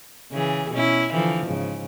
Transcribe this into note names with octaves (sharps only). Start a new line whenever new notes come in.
C#3 E3 G#4
B2 C#4 E4
D3 E3 F3
G#2 C#3